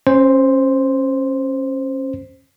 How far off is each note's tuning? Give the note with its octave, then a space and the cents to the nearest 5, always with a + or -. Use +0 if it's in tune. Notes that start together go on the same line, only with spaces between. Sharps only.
C#4 -30 C5 +0